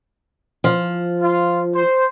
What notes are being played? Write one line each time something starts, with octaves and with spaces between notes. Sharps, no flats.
F3
F4
C5